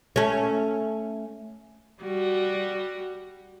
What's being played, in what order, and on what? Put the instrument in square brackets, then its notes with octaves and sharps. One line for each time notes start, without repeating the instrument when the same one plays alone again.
[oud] A3 C#4
[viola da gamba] G3 F#4